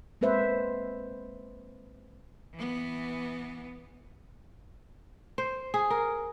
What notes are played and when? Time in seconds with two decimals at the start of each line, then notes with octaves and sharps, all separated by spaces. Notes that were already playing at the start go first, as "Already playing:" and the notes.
0.21 G#3 A#3 C4 B4 C5 E5
2.54 E3 B3
5.38 C5
5.74 G#4
5.90 A#4